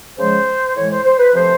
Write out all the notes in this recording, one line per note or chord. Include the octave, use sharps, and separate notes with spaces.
C#3 F3 G#3 C5
A2 E3 G#3 C#5
C5
C5
B4
C3 F3 A3 C5